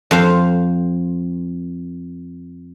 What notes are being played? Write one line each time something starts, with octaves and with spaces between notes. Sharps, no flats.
F2 C5 F5